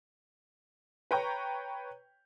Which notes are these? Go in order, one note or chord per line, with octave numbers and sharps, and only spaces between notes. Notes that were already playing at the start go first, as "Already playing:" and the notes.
B4 C#5 G5 A#5 C#6